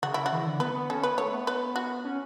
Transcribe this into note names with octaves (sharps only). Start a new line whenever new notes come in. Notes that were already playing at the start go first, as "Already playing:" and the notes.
C#3 F#4
C#3 E4
F#4
E3
D3
B3 B4
B3
C#4 A4
B3 B4
B3
A3 C#5
B3
B4
F#4
C#4